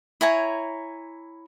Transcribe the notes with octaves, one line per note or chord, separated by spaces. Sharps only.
E4 C#5 G#5 A#5